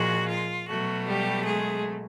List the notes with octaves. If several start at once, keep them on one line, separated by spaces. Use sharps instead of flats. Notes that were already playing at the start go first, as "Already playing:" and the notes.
Already playing: A#2 F3 G#3 F#4
F4
B2 F#3 A3 F#4
G3 G4
G#3 G#4